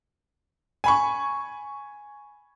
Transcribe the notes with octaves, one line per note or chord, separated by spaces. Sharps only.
G#5 B5 C#6